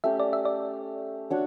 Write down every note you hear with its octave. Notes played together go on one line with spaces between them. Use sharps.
A3 C#4 G4 E5
D5
E5
D5
D4 F#4 C#5